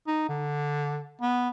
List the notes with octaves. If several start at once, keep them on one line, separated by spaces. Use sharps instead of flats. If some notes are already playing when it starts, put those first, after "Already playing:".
D#4
D3
B3